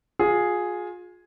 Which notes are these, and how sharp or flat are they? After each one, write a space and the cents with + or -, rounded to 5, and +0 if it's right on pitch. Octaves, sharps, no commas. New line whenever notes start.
F4 +30 G#4 +0